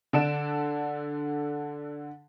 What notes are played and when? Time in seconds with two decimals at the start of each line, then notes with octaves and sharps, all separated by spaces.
0.13 D3 D4 A4 D7 E7